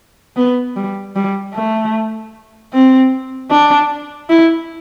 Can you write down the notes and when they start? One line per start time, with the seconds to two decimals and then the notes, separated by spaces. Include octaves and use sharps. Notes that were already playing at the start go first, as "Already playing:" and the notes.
0.36 B3
0.76 G3
1.16 G3
1.54 A3
2.73 C4
3.51 D4
4.30 E4